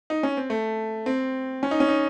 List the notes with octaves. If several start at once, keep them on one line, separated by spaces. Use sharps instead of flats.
D#4
C#4
C4
A3
C4
C#4
D#4
C#4
D#4